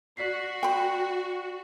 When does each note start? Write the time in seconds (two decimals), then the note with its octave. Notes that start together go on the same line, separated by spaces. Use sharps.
0.17 F#4 D5 B6 C7
0.63 G5 B5